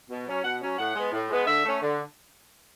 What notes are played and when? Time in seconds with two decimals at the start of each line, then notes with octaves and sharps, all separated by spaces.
0.10 B2
0.27 F#3 C#4
0.44 B2 F#5
0.62 F#3 C#4
0.79 A2 F#5
0.96 G#3 B3
1.13 A2
1.30 G#3 B3
1.47 D3 E5
1.65 A3 C#4
1.82 D3